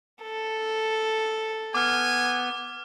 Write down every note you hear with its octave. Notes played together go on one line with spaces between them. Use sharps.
A4
B3 G#5 D6 F6